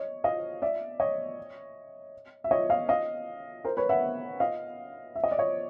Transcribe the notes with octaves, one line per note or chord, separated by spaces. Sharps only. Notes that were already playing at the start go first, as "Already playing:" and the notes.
Already playing: C#5 D#5
D#5 F5
D5 E5
C#5 D#5
E5
C#5 D#5
D#5 F5
D#5 F5
A#4 C5
B4 C#5
E5 F#5
D#5 F5
E5
D#5
D5
C#5 D#5